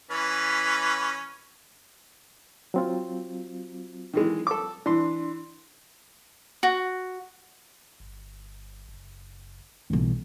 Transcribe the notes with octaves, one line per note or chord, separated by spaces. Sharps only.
E3 C#4 B4
F#3 C4 F4
D#3 E3 G#3
A4 D6
E3 D4 C6
F#4
G1
F#1
B1 E3 G3